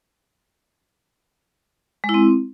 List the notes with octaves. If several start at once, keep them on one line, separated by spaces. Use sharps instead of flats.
G#3
E4
C4